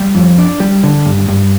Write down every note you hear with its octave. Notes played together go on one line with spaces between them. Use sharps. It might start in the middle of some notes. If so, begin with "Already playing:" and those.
Already playing: G3
F2
D4
G3
D3
G2
G2